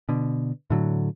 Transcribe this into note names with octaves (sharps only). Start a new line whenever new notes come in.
B2 D3
A2 D3 F#3